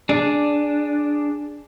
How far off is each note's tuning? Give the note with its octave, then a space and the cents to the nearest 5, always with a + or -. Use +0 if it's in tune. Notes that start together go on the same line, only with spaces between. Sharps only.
D4 +0 G#4 +0